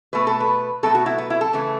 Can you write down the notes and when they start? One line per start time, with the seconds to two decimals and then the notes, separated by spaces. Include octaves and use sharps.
0.13 B2 A3 B4
0.27 A4
0.40 B4
0.83 B2 F#3 A3 A4
0.95 F#4
1.06 E4
1.18 B3
1.30 E4
1.41 A4
1.53 C#3 E3 A3